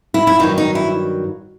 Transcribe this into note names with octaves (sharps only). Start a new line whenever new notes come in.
E4
E4
G2 D#3 F#3 D#4
D#4
E4